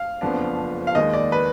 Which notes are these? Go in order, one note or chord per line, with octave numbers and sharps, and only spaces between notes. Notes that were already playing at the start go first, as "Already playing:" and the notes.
Already playing: F5
F#1 F2 F3 B3 D4
F5
D#2 D#3 G#3 D#5
D5
B4